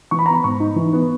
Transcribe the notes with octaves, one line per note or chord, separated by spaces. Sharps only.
E3 C#6
B5
B3 A#5
B5
G#2 C#6
D#4
E3
B3